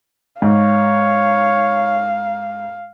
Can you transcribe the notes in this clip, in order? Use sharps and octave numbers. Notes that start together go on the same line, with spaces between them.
G#2 C#5 F5